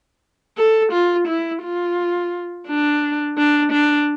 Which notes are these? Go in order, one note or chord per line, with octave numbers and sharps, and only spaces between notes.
A4
F4
E4
F4
D4
D4
D4